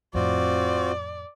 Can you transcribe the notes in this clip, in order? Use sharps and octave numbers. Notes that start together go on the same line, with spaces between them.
F2 A2 C4 F4 F#4 D5